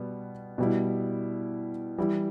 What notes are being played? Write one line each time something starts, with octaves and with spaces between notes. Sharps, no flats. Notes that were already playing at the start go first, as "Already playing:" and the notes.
Already playing: B2 G3 B3
B2 G3 E4
E3 G3 E4